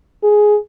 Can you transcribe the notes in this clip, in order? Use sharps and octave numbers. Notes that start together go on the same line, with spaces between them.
G#4